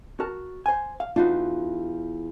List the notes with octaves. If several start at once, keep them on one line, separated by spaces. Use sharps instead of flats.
F#4 A#4 A5
C5 G#5
F5
E2 D4 D#4 F4 F#4